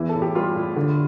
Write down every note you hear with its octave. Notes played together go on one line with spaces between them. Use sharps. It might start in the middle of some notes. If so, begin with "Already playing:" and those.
Already playing: E2 E3 E4
A4
A2
G4
G3 F4
A2
D3